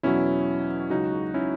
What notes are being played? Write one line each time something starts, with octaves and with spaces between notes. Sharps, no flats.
E2 B2 F#3 C#4 E4
C#2 C#3 F#3 D#4 F#4
C#4 E4